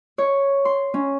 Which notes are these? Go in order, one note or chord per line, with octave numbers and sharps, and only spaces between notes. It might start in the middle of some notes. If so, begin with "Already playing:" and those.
C#5
C6
C#4